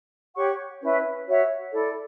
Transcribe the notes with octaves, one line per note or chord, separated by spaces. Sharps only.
G4 C#5 F#5 C#6
C#4 E4 B4 E5
F#4 C#5 E5
E4 A4 D5